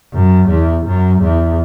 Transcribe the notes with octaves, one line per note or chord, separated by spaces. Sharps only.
F#2
E2
F#2
E2